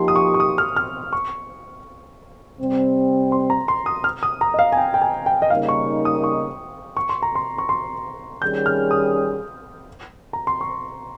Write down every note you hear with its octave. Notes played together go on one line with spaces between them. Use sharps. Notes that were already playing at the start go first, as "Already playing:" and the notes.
Already playing: F3 A#3 D#4 G4 C6
D#6
C#6
C#6
D#6
F6
F6
C#6
C3 G3 C4
C6
A#5
C6
D#6
F6
D#6
A#5
D#5
F5
G#5
G5
G5
G#5
G5
D#5
C#3 G3 A#3 D#4 A#4 F5
C#6
D#6
C#6
C#6
C6
A#5
C6
C#6
C6
D#3 G3 C#4 G#4 G6
F6
D#6
A#5
C6
C#6